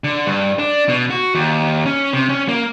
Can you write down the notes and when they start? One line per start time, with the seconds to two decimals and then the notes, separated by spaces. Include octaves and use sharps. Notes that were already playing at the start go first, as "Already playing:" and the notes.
0.04 D3
0.26 G2
0.59 D4
0.89 B2
1.10 F#4
1.35 D#2
1.86 C#4
2.13 C3
2.29 C#4
2.49 A#3